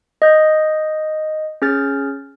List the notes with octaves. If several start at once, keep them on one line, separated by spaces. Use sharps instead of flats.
D#5 G6
C#4 G#4 F6 A6